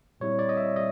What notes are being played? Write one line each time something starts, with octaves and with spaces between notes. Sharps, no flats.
A#2 G3 C4 E4 C#5
D5
D#5
E5
A#2 G3 D#5